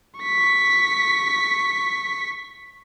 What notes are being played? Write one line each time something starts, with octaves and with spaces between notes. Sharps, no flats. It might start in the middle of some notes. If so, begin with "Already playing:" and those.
C#6 B6